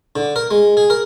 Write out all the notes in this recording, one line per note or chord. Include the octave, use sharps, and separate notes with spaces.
D3
A#4
G#3
G#4
A#4